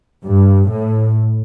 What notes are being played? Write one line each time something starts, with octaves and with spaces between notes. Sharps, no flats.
G2
A2